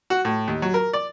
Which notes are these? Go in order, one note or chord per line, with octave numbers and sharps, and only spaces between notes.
F#4
A2
D#2
F#3
A#4
D5